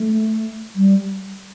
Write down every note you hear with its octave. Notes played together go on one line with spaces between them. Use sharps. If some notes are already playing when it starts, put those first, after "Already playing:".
Already playing: A3
G3